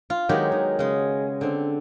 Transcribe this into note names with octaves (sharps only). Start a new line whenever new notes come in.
F4
D#3 F#3 G#3 B3 F#4 G4
D#3
C#3 G#3
D3 C4